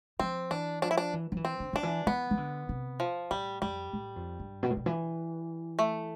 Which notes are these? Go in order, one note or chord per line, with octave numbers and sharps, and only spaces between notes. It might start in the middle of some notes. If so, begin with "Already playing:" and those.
F3 C4
E3 D4
F3 D4
E4
D4
E3
F3
E3
C4
D3
D3 D4
E3
E3 B3
E3
D3
C3
F3
A2 G3
F2 G3
A2
F2
G2
B2
A2
B2
E3
A3